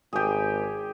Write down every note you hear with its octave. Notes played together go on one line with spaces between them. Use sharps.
G#1 G4 G#4